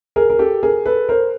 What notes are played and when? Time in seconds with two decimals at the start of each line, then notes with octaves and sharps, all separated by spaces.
0.16 G#4 A#4
0.30 A#4
0.39 G4 A4
0.63 G#4 A#4
0.86 A4 B4
1.09 A#4 C5